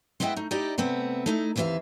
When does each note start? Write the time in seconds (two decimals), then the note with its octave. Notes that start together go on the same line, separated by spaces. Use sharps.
0.20 G#3 B3 E4 D#5 E5 G5
0.36 A3 D#4
0.51 D#4 E4 G4 D5 D#5
0.78 C3 A3 B3 C4
1.26 A3 D#4 E4
1.56 D#2 C3 E3 D5 E5 F5